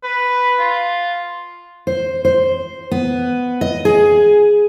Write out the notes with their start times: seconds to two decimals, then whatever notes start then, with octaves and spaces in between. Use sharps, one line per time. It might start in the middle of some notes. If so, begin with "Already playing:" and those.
0.04 B4
0.59 F4
1.87 C5
2.25 C5
2.91 B3
3.61 D#5
3.85 G#4